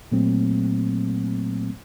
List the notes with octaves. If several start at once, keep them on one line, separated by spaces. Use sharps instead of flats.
A#2 F#3 A3 A#3 C4